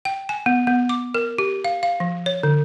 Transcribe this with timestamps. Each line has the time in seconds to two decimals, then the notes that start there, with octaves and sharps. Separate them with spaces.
0.05 G5
0.29 G#5
0.46 B3
0.67 B3
0.89 D6
1.15 A#4
1.38 G4
1.64 F5
1.83 F5
2.00 F3
2.26 C#5
2.43 D3